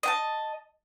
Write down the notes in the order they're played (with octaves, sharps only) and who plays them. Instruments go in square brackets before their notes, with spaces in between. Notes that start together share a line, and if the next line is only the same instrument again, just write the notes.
[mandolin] D#5 F#5 A5